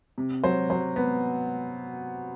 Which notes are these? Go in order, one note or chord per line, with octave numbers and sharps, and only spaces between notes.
C3
F#3 C5
F#3 C5
B3